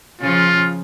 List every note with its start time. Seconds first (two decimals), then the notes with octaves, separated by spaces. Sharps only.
0.21 C#3 F3 F4